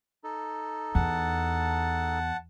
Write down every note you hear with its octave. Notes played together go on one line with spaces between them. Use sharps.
D#4 A4
E2 F#5 A5